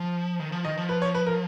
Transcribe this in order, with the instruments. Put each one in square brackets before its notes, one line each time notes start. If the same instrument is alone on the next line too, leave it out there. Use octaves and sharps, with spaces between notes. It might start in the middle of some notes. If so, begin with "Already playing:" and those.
Already playing: [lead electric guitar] F3
D#3
F3
[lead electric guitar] D#3 [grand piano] D#5
[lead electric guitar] F3
[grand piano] B4
C#5
B4
A#4